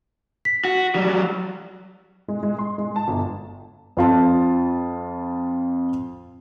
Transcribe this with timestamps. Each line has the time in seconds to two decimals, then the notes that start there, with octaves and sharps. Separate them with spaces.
0.45 B6
0.65 F#4
0.95 F#3 G3
2.28 G#3
2.43 G#3
2.58 C6
2.78 G#3
2.96 A5
3.08 G1
3.97 F2 F4 A5